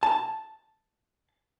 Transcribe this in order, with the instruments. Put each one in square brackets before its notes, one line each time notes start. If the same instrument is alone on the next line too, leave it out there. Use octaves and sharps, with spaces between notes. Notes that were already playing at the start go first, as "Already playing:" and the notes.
[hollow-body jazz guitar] A5